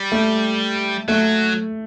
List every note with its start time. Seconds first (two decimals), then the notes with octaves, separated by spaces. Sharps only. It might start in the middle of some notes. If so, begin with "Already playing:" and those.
Already playing: G3
0.12 A3
1.08 F#3 A3